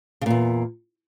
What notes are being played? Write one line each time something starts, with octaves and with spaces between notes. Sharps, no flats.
E2 A#2 C#3